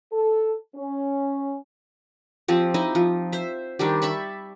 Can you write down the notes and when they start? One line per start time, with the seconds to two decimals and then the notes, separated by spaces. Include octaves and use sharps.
0.12 A4
0.76 C#4
2.48 F3 C4 G4
2.74 D#4 E4 D#5
2.95 F3
3.32 C5 E5
3.79 D#3 G3 D4 G4
4.02 E5 A5 B5 C#6